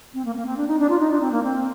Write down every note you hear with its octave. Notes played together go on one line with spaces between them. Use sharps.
C4
A#3
A#3
C4
D4
D#4
D4
F4
D#4
D4
C4
A#3
C4